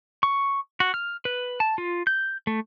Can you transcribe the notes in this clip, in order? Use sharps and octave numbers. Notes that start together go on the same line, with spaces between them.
C#6
F#4
F6
B4
A5
F4
G6
A3